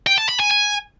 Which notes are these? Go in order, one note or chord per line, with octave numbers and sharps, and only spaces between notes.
G5
A5
B5
G#5
G#5